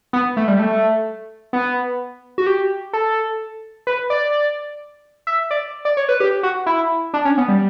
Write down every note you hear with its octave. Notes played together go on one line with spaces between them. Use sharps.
B3
A3
G3
A3
B3
F#4
G4
A4
B4
D5
E5
D5
D5
C#5
B4
G4
F#4
E4
D4
C#4
B3
G3